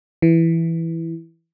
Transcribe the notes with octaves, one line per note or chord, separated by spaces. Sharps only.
E3